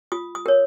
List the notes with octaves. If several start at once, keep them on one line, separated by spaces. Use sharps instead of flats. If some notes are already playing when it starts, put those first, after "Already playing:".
F4 D#6
D#6
A#4 C#5